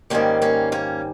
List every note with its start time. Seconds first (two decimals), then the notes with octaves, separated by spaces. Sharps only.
0.10 G#2 D#3 G3 A#3 C#4
0.42 A#3 C#4
0.72 A#3 C#4